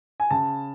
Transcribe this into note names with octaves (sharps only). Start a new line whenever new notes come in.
G#5
C#3 A5